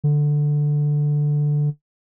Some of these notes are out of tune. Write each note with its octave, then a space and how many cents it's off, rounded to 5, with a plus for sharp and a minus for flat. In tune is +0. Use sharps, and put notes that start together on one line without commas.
D3 +5